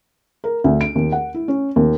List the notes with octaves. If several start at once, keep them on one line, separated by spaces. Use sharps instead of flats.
A#4
D2
D7
D#2
F#5
E4
C#4
D#2